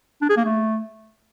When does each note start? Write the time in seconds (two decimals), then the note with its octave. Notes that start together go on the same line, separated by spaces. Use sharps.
0.22 D4
0.29 G#4
0.37 A#3
0.45 A3